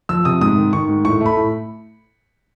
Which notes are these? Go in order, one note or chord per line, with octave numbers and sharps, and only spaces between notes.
F3 E6
C3 D#6
G#2 D#6
D#3
D#3 C#6
G#2
A2 C#6
A3 B5
A2